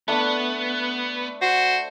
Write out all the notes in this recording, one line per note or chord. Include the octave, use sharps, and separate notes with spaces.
A3 B3 D4
F#4 C5